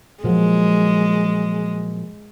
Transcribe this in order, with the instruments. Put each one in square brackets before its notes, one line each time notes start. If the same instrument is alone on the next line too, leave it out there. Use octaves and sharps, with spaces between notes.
[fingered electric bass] A#2 F3 F#3 [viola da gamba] G#3